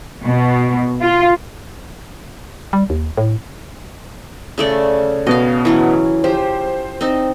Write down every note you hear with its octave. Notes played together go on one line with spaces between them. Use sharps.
B2
F4
G3
D#2
A2
C#3 A3 D5
B2 B3 D#5 F5
E3 F#3 C#4
F3 G4 C5
C4 D#4